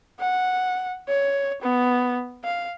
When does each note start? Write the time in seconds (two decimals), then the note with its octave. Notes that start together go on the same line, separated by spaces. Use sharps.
0.20 F#5
1.09 C#5
1.62 B3
2.44 F5